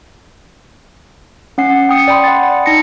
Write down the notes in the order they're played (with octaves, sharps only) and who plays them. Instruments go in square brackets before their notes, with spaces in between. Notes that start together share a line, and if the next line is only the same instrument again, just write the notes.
[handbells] C#4 F#5 C7
G5 D#6 C#7
D5 G5 B5 C6
F#5 A6
D#4 A5 A#6 C#7